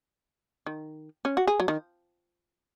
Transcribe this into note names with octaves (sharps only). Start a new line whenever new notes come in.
D#3
C#4
F#4
G#4
F#3
D#3